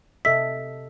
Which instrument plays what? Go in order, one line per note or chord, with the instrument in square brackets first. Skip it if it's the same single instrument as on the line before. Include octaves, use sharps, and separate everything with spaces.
[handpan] C3 A4 D#5 [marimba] E5 E6 [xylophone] B6